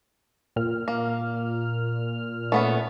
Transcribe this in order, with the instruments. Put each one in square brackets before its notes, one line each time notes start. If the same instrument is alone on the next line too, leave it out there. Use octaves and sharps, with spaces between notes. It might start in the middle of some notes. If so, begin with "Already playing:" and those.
[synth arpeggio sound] A#2 F6
[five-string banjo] A#3
A3 B3 C#4